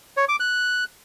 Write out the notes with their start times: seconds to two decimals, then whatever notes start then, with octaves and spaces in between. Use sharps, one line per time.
0.17 C#5
0.28 D6
0.40 F#6